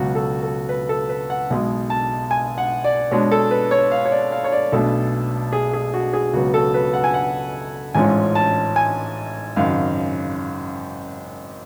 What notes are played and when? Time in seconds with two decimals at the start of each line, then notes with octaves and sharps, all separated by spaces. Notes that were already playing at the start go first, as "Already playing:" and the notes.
Already playing: C#2 B2 F#3 F#4
0.15 A4
0.43 A4
0.69 B4
0.89 A4
1.09 B4
1.30 F#5
1.50 B1 B2 G#3
1.90 A5
2.31 G#5
2.58 F#5
2.84 D5
3.11 B2 G#3 D4 C#5
3.31 A4
3.51 B4
3.71 C#5
3.91 F5
4.05 C#5
4.12 D5
4.32 F5
4.44 C#5
4.52 D5
4.72 B1 B2 A3 D4 A4
5.53 G#4
5.73 G#4
5.94 F#4
6.13 G#4
6.33 C#2 B2 F#3 B3 F#4
6.54 A4
6.74 B4
6.94 F#5
7.04 G#5
7.14 F#5
7.95 A1 G#2 G#3 C#4 F4 G#5
8.35 A5
8.76 G#5
9.56 G#1 F#2 C#3 F5